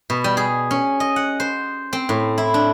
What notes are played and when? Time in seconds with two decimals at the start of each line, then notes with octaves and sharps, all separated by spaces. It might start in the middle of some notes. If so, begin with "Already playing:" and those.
0.10 B2
0.24 G3
0.37 G#4
0.71 C#4
1.00 D#5
1.16 F#5
1.40 C5
1.93 C4
2.09 A2
2.38 E4
2.54 D4